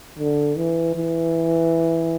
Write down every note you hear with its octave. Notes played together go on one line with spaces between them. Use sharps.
D3
E3
E3